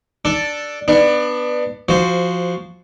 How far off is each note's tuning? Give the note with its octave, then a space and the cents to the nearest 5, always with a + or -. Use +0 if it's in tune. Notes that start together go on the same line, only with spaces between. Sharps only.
D4 +0 A4 +0
B3 +0 D4 +20
F3 +0 F#4 +0 C5 -10